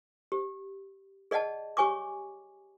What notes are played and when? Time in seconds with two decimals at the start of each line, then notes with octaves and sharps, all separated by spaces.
0.32 G4
1.31 G#4 D5 D#5 F#5 A5
1.77 G4 C#5 G#5 C#6 D6